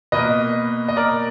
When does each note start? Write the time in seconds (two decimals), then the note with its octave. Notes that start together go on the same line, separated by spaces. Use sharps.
0.12 B2 A#3 B4 D#5
0.89 D#5
0.97 A#4 D5